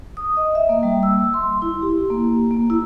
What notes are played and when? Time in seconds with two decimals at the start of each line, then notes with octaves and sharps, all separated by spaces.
0.17 D#6
0.37 D#5
0.55 E5
0.69 A#3
0.83 G3
1.03 E6
1.34 C6
1.62 E4
1.82 G4
2.10 A#3
2.51 A#3
2.70 E4